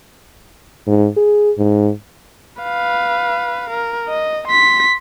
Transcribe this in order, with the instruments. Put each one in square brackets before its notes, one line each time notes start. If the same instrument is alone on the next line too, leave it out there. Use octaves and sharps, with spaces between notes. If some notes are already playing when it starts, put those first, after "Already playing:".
[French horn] G#2
G#4
G#2
[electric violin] B4 F5
A#4
D#5
C6 B6